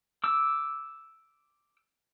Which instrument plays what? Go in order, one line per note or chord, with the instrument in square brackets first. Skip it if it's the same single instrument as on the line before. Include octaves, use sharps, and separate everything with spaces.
[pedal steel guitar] D6 E6